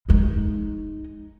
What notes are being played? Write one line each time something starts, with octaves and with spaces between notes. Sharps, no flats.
G#3 D#4